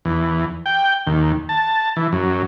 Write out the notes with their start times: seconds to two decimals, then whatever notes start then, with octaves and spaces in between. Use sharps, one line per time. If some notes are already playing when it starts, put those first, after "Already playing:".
0.05 E2
0.66 G5
1.07 D#2
1.49 A5
1.96 E3
2.13 F#2